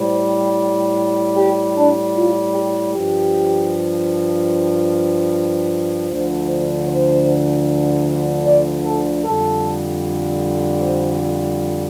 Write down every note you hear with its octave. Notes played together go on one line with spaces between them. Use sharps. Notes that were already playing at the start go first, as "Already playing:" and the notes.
Already playing: A2 G3 C5
G4
D4
F4
G4
G2 F3 G4
D2 D3 F3 C5
C5
C5
D5
A4
F2 D3 G3 A4
C5